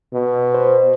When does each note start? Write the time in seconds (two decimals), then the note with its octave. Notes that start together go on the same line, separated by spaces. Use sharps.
0.13 B2
0.55 C5